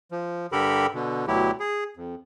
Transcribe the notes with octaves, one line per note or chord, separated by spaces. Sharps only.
F3
G2 D3 G4 A4 A#4 B5
B2 D3
D2 B2 F#3 E4 G4
G#4
F2